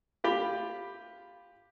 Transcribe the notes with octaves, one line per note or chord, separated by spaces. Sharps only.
F4 G4 B5